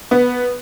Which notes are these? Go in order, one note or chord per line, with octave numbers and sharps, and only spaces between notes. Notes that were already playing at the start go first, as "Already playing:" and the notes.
B3